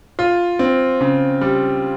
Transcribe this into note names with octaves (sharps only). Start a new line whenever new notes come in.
F4
C4
C#3
G3